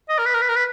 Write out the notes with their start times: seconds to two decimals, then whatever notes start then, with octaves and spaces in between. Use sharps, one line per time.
0.09 D#5
0.18 A#4
0.26 B4
0.34 A#4
0.41 B4
0.49 A#4
0.56 B4